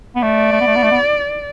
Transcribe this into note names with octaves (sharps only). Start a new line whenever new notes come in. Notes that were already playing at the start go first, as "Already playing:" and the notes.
B3
A3 D5
A3
B3
A3
B3
A3
B3